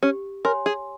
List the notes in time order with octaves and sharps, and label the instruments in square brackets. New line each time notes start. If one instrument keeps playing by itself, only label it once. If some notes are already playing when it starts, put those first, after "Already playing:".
[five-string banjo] C#4 [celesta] G4
[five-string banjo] A#4 [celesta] C#5 G#5 C6
[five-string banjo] G#4